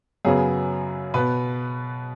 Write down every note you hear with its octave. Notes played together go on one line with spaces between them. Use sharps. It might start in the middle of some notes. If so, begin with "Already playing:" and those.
F#2 C#3 F#3 B3 G#4
B2 B3 B4